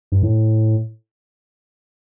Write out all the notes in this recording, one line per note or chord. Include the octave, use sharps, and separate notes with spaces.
G2
A2